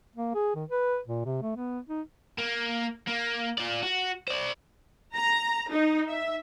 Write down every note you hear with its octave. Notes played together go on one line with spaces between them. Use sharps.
A#3
G#4
D#3
B4
A#2
C3
A3
B3
D#4
A#3
A#3
F4 D5
F#4
C5 D5
A#5
D#4
E5